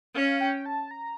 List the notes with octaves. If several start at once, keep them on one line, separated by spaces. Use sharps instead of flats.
C#4 F5
G5
A5
A#5